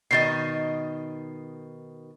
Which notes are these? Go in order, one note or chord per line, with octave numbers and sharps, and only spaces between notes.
B2 D#3 D#5 A6 C7